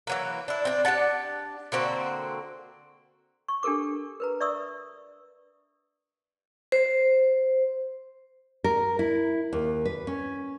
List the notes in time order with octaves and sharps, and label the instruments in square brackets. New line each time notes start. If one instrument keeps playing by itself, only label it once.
[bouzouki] E3 F#3 A#3
D4 E4
C4 D4
D4 G4 F#5 A5
D3 A#3 C4 F#4
[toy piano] C#6
D4 G4 A4 A#4 D6
A#4 B4 A#5
D5 E5 C#6 D#6 E6
[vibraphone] C5
[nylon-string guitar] A#4
E4
D#2
B4
C#4